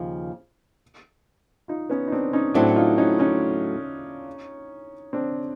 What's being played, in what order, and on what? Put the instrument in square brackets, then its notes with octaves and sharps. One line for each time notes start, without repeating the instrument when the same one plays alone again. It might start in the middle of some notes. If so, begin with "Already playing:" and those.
Already playing: [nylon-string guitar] D#2 C#3 F3
[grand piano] D#4 F4
B3 C#4
D#4
C4 D4
C#4 D#4
[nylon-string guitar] A2 F#3 A3 C4 [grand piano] D4 E4
[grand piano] D#4 F4
C#4 D#4
C#4 D#4
C4 D4